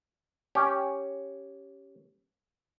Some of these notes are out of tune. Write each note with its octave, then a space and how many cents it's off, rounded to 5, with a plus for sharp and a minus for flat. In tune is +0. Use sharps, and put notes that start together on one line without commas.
C#4 +0 G4 +0